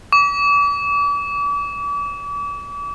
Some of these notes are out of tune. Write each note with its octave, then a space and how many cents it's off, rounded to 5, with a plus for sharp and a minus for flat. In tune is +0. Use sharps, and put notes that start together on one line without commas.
D6 -40